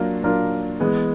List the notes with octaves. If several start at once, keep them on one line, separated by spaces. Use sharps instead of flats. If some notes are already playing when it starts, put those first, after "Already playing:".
Already playing: F#3 A#3 D4 F4 A#4
F#3 A#3 D4 F4 A#4
E3 G#3 B3